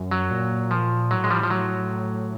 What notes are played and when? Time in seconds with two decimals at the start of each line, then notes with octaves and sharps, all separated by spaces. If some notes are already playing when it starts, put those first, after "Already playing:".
Already playing: F#2
0.11 F#3
0.31 A#2
0.71 F3
1.11 A2 F#3
1.24 G#3
1.30 F3 G3
1.43 F3
1.50 F#3